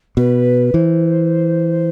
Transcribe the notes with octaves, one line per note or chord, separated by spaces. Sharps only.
B2 B4
E3 C5